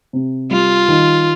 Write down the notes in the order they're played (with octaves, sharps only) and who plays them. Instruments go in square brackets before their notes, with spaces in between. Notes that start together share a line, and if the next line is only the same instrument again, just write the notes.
[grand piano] C3
[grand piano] G3 [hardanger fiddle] F4
[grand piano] D#3